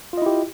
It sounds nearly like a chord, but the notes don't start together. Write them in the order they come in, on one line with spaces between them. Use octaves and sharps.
F4 D#5 E4 G4